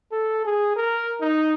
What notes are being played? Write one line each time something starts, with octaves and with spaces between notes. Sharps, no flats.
A4
G#4
A#4
D#4